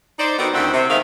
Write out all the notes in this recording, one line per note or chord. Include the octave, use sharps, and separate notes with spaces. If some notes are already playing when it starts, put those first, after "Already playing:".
D#4 C5 D5
D#3 B3 F#4 G4 A4 D5
D2 D#3 C4 E4 F#5
C3
E2 D#3 G#3 A3 F5